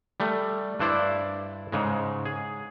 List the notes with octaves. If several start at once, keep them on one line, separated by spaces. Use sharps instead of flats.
G3 A3
G2 D4 E4 C5 D5
G#2 C#3 G#3
G#4